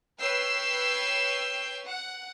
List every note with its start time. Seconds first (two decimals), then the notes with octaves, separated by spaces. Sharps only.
0.20 B4 C#5 G5 E6 C7
1.87 F#5